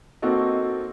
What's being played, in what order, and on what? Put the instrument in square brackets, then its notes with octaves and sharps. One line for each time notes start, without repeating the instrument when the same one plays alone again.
[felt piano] A#3 C4 D#4 F#4 A4 D#5